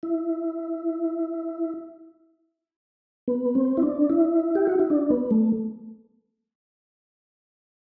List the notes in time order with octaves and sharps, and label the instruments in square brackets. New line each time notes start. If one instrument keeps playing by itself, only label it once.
[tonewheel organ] E4
B3
C4
E4
D4
E4
G4
F#4
E4
D4
B3
A3